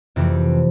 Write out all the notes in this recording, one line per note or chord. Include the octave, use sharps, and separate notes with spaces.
F2 C3 E3 A3 C4